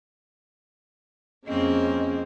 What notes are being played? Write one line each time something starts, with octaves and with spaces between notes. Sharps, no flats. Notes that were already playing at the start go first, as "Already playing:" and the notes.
F2 C#3 A#3 C4 C#4 D#5